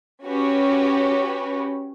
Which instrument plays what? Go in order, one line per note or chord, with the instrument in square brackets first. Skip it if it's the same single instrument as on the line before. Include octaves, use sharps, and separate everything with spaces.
[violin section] C#4 F#4 G4 B4